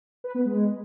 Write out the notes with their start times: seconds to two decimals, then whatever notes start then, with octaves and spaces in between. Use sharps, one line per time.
0.24 B4
0.35 B3
0.45 G#3